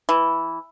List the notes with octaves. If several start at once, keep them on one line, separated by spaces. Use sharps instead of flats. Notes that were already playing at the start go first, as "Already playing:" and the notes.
E3